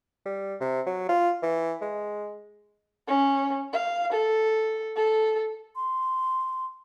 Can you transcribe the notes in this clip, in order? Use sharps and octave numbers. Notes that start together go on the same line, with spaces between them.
G3
C3
F#3
F4
E3
G#3
C#4
F5
A4
A4
C6